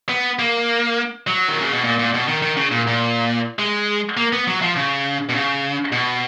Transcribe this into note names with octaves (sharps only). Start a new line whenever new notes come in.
B3
A#3
F#3
D#3
C#3
B2
A#2
A#2
B2
D#3
D#3
C#3
A#2
A#2
G#3
A#3
B3
F#3
F3
C#3
B2
C#3
B2